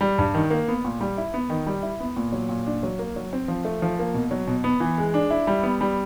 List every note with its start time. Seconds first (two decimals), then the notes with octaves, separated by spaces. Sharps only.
0.01 G3
0.18 G2
0.34 D#3
0.50 A#3
0.68 B3
0.85 A#2
1.01 G3
1.18 E4
1.34 B3
1.50 D#3
1.67 G3
1.83 E4
2.00 B3
2.17 A#2
2.32 F#3
2.49 A#2
2.66 D4
2.83 F#3
2.99 A#3
3.16 F#3
3.33 C4
3.48 F3
3.65 A3
3.82 F3
3.99 A#3
4.14 B2
4.31 F#3
4.47 B2
4.64 B3
4.80 E3
4.98 G#3
5.14 D4
5.31 E4
5.47 G3
5.63 B3
5.81 G3